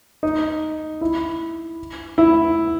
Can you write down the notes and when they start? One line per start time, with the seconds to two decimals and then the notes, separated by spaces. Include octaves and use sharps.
0.23 D#4
1.01 E4
2.18 E4